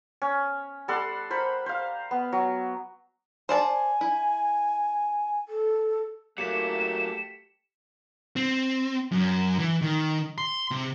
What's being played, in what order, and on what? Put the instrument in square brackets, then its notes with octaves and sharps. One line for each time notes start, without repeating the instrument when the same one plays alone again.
[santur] C#4
G3 A4 F#5 C6
A#4 C5 B5
C5 F5
B3
F#3
[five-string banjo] C5 D5 A5 [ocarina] G#5
[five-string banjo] E4
[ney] A4
[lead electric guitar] F#3 A#3 [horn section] A3 G4 [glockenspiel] B6 C#7 [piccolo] E7
[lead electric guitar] C4
F#2
E3
D#3
C6
C3